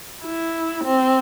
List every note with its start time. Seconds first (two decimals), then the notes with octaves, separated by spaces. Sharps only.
0.23 E4
0.84 C4